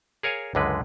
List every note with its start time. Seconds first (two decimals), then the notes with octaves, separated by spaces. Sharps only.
0.23 G#4 A#4 C#5 F5 G#5
0.55 C#2 F#2 D3 G#3 B4